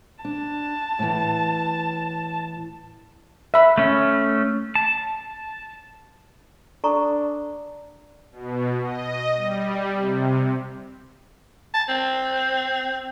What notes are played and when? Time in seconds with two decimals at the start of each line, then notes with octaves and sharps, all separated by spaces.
0.25 D4 A5
0.99 A2 E3
3.54 E5 B5
3.78 A3 C#4
4.75 A5
6.84 D4 A4 A#5 C#6
8.32 B2
8.83 D#5
9.36 G3
9.96 C3
11.74 A5
11.89 C4